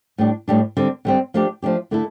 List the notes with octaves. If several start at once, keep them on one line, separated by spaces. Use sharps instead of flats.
A2 G3 D4
A2 G3 D4
D3 G3 C4
D3 G3 C4
F3 A3 D4 G4
F3 A3 D4 G4
D3 A3 E4 A4